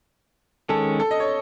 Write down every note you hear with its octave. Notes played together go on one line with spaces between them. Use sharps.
D#3 G#3 C#4 A4
A4
D#5
C#5